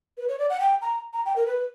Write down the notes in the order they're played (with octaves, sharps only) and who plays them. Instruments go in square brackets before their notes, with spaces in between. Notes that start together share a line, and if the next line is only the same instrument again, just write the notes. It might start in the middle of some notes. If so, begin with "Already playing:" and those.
[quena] B4
C#5
D5
F#5
G5
A#5
A#5
G5
A#4
B4